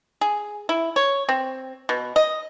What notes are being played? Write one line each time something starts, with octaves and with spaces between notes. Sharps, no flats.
G#4
E4
C#5
C4
B2
D#5